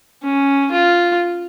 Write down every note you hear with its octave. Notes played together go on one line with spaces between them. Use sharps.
C#4
F4